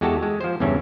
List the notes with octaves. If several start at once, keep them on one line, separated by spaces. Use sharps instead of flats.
E2 G#3 F#4 G4 A4 A5
G#3
F3 C5
E2 G2 C#3 E3 C#4